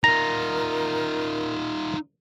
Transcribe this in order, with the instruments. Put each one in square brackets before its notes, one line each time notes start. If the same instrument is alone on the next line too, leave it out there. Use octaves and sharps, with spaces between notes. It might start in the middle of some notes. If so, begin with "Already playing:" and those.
[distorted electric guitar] D#4 F4 [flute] A#4 [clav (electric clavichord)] A#5